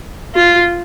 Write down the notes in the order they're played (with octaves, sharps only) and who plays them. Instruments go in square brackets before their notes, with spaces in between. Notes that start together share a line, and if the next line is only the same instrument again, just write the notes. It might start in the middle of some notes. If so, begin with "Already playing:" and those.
[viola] F4